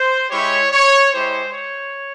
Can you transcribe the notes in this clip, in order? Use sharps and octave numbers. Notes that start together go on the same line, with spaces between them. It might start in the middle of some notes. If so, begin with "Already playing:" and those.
Already playing: C5
G#3 E4 G4 C#5
C#5
G#3 E4 G4 C5
C#5